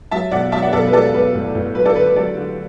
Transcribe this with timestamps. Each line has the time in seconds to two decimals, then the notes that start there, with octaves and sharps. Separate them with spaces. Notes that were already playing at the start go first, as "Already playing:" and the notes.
0.11 F#3 E5 A5
0.31 B1 D5 F#5
0.52 F#3 E5 A5
0.62 D5 F#5
0.73 B1 A4 D5
0.87 B4
0.93 F#3 A4 D5
1.14 B1 B4
1.34 A2
1.55 A2
1.75 F#3 B4
1.85 A4 D5
1.95 D3 B4
2.06 B4
2.16 F#3 A4 D5
2.37 D3